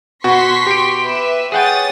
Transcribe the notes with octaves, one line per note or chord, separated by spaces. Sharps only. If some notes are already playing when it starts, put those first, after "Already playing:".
B2 F#4 C6 C#6 B6
G4 D7
B4 E5
G#4 C#5 F#5 G5 D#6 A6